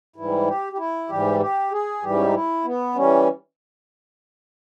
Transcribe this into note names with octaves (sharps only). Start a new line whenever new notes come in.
G#2 E3 G3 E4
G4
G4
E4
G#2 E3 G3 G4
G4
G#4
G#2 E3 G3 G4
C#4
D#4
E4
B3
E3 G3 C#4